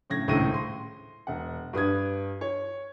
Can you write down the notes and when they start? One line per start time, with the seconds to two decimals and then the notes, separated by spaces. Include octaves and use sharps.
0.10 A2 C#3 G#6 A#6
0.28 D#1 C#2 A2 E4 A#6 D#7
0.54 C6
1.27 E1 F#5
1.73 G2 B4 D#6 G#6
2.41 C#5